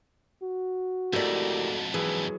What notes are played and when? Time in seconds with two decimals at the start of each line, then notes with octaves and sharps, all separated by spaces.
0.43 F#4
1.13 F2 G#2 A3 E4 G4 A#4 D5
1.94 E3 F#3 G#4